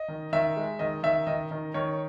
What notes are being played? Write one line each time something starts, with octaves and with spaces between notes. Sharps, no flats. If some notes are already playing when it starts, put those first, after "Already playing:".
Already playing: D#5
D#3
D#3 E5
G#3
D#3 D#5
D#3 E5
D#3 D#5
D#3
D#3 C#5